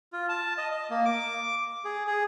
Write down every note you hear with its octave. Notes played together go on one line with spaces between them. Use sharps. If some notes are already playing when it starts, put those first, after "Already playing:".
F4
A5
D#5
D#5
A#3
D6
G#4
G#4